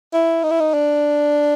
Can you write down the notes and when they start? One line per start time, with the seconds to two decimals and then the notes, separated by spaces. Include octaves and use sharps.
0.13 E4
0.43 D#4
0.51 E4
0.60 D#4
0.74 D4